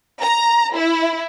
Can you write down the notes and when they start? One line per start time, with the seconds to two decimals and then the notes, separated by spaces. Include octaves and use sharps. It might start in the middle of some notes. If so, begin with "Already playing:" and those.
0.22 A#5
0.74 E4